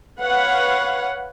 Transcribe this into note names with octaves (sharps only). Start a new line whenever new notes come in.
B4 C#5 F5 F#5